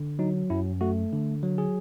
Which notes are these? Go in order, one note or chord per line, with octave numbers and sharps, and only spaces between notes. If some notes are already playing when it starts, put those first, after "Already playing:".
Already playing: D3
F#3 D#4
F#2 E4
A3 F#4
D3
F#3
G#4